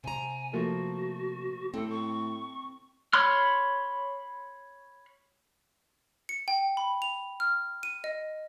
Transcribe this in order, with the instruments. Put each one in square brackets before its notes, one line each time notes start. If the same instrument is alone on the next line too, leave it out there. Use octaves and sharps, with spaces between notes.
[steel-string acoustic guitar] C3 A#5 [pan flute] G#5
[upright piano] F3 A3 A#3 [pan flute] F#4
[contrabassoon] A2 [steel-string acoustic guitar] C4 [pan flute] A4
[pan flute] C#6
[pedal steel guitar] C#5 B5 C6 F6
[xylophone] C#7
G5
B5
F7
F6
D#7
D#5